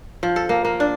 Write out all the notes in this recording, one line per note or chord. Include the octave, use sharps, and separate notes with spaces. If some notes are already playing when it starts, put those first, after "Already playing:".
F3
A4
A#3
A#3
D4